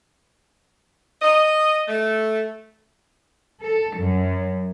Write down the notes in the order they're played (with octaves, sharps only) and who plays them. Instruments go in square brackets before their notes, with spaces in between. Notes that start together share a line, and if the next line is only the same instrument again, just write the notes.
[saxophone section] D#5
A3
[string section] A4
F#2